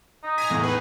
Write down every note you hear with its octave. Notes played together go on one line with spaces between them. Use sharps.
D#4
G#5 A#5 B6 D#7 F7
E2 A2 G#3
D#4 G#4 B4